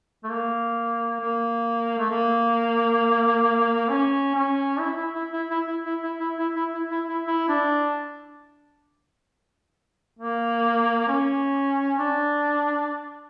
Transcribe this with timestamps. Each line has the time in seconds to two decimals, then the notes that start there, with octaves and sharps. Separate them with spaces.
0.24 A3
0.31 A#3
1.20 A#3
1.99 A3
2.10 A#3
3.89 C#4
4.35 C#4
4.80 E4
4.97 E4
5.15 E4
5.33 E4
5.50 E4
5.67 E4
5.85 E4
6.03 E4
6.20 E4
6.38 E4
6.56 E4
6.74 E4
6.91 E4
7.09 E4
7.26 E4
7.49 D4
10.19 A#3
11.08 C#4
11.98 D4